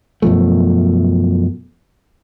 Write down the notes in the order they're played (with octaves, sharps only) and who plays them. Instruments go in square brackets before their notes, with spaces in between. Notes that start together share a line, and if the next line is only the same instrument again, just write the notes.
[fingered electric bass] F#2 B2 F3 A3